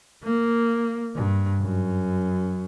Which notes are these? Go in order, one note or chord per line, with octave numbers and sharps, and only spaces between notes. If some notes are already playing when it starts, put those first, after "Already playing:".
A#3
G2
F#2